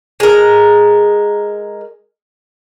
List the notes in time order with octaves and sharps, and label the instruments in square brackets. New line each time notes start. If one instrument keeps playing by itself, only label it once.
[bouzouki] G#3 A#4